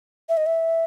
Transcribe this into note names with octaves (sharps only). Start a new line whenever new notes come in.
E5
D#5
E5